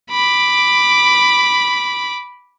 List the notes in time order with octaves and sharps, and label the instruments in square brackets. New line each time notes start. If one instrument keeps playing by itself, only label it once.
[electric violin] B5 D6